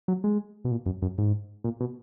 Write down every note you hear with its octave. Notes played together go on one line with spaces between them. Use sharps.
F#3
G#3
B2
A#2
F#2
F#2
G#2
A#2
B2